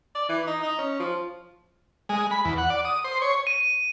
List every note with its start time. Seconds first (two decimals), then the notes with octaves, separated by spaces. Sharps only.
0.15 D5
0.29 E3
0.47 D#4
0.63 D#4
0.79 C#4
1.00 F3
2.09 G#3
2.31 B5
2.45 E2
2.58 F#5
2.70 D5
2.85 D#6
3.04 C5
3.22 C#5
3.47 D#7